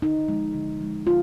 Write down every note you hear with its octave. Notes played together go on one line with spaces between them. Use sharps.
D3 D#4
F3 G#3
D3
F3 G#3
D3 F4